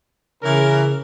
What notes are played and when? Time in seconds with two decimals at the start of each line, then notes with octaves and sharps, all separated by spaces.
0.43 C#3 E3 C#4 A#4